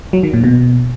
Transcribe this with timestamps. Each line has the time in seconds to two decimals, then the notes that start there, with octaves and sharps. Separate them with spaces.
0.13 F#3
0.23 D#3
0.33 A#2
0.44 B2